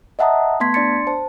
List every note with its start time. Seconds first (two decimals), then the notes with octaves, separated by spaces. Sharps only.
0.19 D#5 E5 F#5 A5 A#5 D#6
0.60 A3 B3 A5 C6 G#6 B6
0.74 D4 D5 C6 A6 C#7
1.07 C5 A5